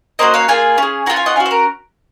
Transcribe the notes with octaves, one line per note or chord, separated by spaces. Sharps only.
A#3 C#4 F#4 C5 D#5
C#5 F5
A#3 F4 G#4 F5 G#5
C#4 G#4
C#4 F4 G#4 F#5 A#5
F5 G#5
D#5 F#5
C#4 F#4 F5 G#5
C5
A#4